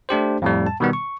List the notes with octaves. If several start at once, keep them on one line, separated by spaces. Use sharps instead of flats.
A3 D4 G4 C5
F2 A2 G3
A5
B2 D#3 G3 B3
C#6